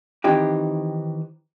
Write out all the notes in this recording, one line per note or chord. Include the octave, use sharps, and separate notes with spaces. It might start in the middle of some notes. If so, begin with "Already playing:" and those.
D#3 E3 C4 D#4 G4